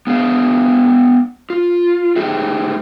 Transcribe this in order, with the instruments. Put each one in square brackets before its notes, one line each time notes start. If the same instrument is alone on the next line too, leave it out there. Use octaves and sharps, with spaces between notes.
[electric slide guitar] B3 D4 G#4 F5
F4
A3 D#4 G4 G#4 E5